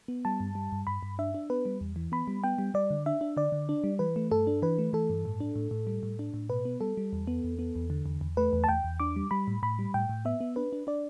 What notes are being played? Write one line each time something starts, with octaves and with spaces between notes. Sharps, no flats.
B3
G3 A5
G2
G3
G2
G2 B5
G2
D4 E5
D4
B3 B4
G3
E2
E3
B3 B5
G3
B3 G5
G3
G3 D5
D3
D4 E5
D4
D3 D5
D3
D4
G3
E3 B4
A3
G2 A4
D4
E3 B4
A3
E3 A4
G2
A2
D4
A2
A2
G3
A2
D4
A2
B2 B4
B3
G3 A4
G3
E2
B3
E2
B3
E2
D3
E2
E2
A3 B4
E2
A5
E2 G5
E2
D4 D6
G3
G3 B5
A2
A2 B5
G3
A2 G5
A2
B3 E5
B3
D4 B4
D4
D4 D5